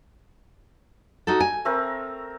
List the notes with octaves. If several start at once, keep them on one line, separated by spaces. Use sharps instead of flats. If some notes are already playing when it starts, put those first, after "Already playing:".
D#4 F#4 A4
G#5
A3 C4 A#4